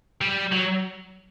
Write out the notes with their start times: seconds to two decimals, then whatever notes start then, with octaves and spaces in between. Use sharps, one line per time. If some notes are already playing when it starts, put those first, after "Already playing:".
0.21 G3
0.53 F#3